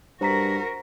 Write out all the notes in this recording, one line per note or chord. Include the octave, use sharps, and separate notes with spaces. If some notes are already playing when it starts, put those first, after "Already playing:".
G2 F#4 A#4 C5 A#5 B6